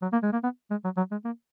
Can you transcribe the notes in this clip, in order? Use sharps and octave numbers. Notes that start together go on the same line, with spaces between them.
F#3
A#3
G#3
A#3
B3
G#3
F#3
F#3
G#3
A#3